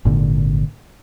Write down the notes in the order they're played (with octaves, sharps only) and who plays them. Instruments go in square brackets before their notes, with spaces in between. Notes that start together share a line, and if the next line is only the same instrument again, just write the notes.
[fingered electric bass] G#1 A#2 D3